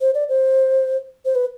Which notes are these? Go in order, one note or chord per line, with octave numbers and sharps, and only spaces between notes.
C5
D5
C5
C5
B4